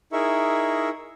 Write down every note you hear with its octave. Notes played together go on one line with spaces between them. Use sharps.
D#4 E4 G#4 A#4 E5 C#6